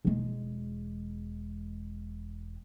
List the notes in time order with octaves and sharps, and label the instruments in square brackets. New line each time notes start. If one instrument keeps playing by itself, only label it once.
[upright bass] E1 G#3